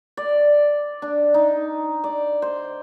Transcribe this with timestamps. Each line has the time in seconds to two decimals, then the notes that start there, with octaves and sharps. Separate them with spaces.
0.17 D5
1.02 D4
1.34 D#4
2.04 D5
2.42 C5